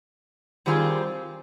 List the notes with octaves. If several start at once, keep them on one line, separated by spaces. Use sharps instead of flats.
D#3 G3 C4 F4 G#4